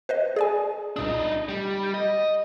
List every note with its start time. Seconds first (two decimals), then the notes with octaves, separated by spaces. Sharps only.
0.09 B4 C5 D#5
0.36 G#4 D5 G#5
0.96 C2 A#2 D4 D#4 D#6
1.49 G3
1.94 D#5